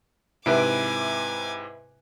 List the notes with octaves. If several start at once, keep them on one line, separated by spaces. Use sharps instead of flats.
G#2 C3 E4 B4 E5 G#5 D6 D7